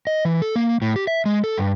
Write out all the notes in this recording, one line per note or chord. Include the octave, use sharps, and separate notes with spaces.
D#5
E3
A4
A#3
A2
G4
E5
G#3
A4
G2